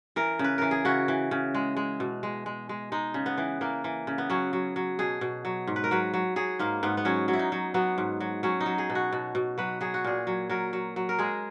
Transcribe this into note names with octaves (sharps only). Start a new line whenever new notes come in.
E3 A#4
C#3
B4
E3 A#4
G#4
C#3 F#4
E3
C#3
G#3
G#3
B2
G#3
G#3
G#3
G#3 D#4
C#3
B3
E3
E3 A#3
E3
C#3
B3
F#3 C#4
F#3
F#3
B2 G#4
B2
F#3
G#2
B4
A#4
F#3 B4
F#3
F#3 G#4
G#2 A#3
G#2 B3
B3
F#3 C#4
F#3
E4
D#4
F#3
F#3 B3
G#2
F#3
F#3 C#4
D#4
F#3
G#4
B2
F#4
B2
B2
F#3 B4
F#3 G#4
F#4
A#2 G#4
F#3
F#3 A#4
F#3
F#3
A#4
G#3 G#4